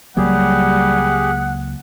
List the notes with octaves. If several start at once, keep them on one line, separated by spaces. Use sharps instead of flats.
C#2 F#3 G3 A#3 G4 G#4 F#5